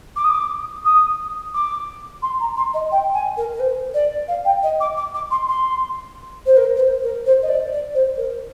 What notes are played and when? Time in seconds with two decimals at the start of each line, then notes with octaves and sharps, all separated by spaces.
0.16 D6
0.24 D#6
0.30 D6
0.85 D#6
1.54 D6
2.22 C6
2.40 A#5
2.57 C6
2.73 D#5
2.91 G5
3.13 G#5
3.37 A#4
3.53 A#4
3.60 C5
3.94 D5
4.28 F5
4.45 G5
4.62 D#5
4.80 D6
4.97 D6
5.14 D6
5.31 C6
5.48 C6
6.46 C5
6.57 A#4
6.76 A#4
6.79 C5
7.03 A#4
7.25 C5
7.42 D#5
7.48 D5
7.72 D5
7.94 C5
8.17 A#4